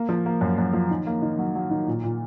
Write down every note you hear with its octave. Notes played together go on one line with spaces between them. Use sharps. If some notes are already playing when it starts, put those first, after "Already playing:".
Already playing: A#3
F3
A#3
F#2
F#2
F3
D#3
A#3
D#3
F#3
F#3
D#3
A#2
A#2